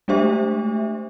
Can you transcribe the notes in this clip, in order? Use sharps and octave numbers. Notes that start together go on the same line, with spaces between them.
G#3 A3 D4 G4 C5 E5